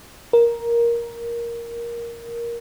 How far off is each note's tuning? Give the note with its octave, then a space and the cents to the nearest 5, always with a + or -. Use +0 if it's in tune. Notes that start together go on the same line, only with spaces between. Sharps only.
A#4 +10